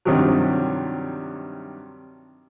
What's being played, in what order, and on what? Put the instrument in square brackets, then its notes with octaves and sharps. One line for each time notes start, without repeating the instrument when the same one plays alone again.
[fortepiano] G2 C3 D#3 F3 F#3